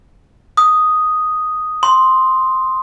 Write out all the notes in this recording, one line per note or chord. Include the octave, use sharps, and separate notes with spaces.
D#6
C6